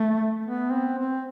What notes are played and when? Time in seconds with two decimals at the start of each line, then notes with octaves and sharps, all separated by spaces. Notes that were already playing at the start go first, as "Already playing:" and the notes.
Already playing: A3
0.46 B3
0.72 C4
0.98 C4